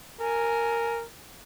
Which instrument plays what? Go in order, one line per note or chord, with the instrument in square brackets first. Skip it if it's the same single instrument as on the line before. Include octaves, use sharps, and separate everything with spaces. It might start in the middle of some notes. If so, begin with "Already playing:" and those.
[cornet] A#4 [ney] G#5